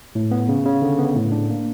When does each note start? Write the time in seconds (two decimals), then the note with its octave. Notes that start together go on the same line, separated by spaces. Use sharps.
0.15 A2
0.31 B3
0.49 C#3
0.66 C#3
0.82 D3
0.99 B3
1.16 A2
1.32 D4
1.50 A#3